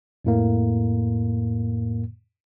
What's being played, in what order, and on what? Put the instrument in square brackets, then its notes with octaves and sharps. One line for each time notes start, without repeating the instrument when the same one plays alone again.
[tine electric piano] F2 A2 A#3